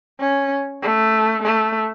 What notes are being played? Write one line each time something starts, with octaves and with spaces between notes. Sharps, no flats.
C#4
A3
A3